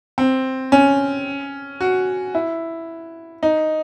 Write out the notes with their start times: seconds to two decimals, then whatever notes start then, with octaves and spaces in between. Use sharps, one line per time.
0.18 C4
0.72 C#4
1.81 F#4
2.35 E4
3.43 D#4